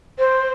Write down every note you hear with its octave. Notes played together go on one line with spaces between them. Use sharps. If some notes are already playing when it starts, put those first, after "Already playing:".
C5